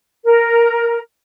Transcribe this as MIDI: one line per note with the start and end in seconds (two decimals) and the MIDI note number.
0.25 0.99 70